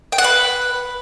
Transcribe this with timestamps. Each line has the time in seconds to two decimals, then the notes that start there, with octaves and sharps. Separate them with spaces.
0.12 G5
0.18 F#5
0.24 B4